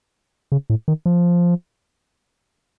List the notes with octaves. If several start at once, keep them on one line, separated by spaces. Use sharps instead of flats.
C#3
A2
D#3
F3